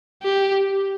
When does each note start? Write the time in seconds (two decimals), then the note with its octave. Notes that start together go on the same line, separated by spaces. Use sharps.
0.24 G4